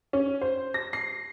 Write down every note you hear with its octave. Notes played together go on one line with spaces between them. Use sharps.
C#4
C5
A#6
C7